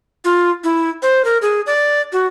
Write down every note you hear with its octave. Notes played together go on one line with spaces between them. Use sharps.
F4
E4
C5
A#4
G#4
D5
F#4